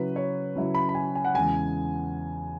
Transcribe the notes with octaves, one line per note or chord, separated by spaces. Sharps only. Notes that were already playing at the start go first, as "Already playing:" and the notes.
Already playing: C#3 F#3 E4 B4
C#5
C#3 F#3 E4
B5
B5
G#5
G#5
F#5
E2 C#3 G#3 G#5